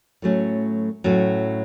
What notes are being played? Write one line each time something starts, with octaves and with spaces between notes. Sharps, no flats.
A2 F#3 A3 C#4
A2 F#3 A3 C#4